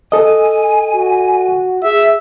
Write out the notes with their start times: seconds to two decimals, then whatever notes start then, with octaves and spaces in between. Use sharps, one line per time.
0.12 A4 D#5 G#5
0.93 F#4
1.84 G#4 E5